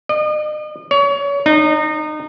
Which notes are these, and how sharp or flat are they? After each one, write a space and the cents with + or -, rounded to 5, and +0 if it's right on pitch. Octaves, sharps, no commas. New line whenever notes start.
D#5 -40
C#5 +30
D#4 -30